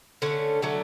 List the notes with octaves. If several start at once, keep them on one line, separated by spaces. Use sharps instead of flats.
D3 A3 C#4
D3 F#3 A3